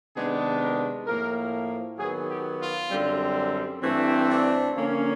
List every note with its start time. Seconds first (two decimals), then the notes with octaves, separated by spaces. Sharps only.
0.15 C3 D#3 G#3 B3 D4 G#4
0.61 A#4
1.07 A2 F3 A#3 A#4
1.99 D#3 F#3 B3 G#4
2.29 G4
2.60 F4
2.91 F#2 D3 G3 C4
3.82 G2 E3 A3 C4
4.29 D4
4.74 D3 F3 A#3 C#4